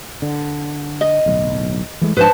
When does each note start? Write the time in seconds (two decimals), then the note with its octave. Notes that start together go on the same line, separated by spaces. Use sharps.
0.22 D3
1.01 D#5
1.26 D1 B1
2.01 E3 G#3 A3
2.17 G#2 F3 D4 B4 C5 A5